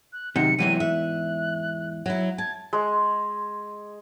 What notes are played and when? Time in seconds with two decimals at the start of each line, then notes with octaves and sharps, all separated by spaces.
0.13 F#6
0.36 F#2 C3 D#3 F#4 C#7
0.59 E2 G#2 C3 E3 F#3 G3 D#7
0.80 E5 F#6
2.06 F#3 E4
2.38 A5 G#6
2.73 G#3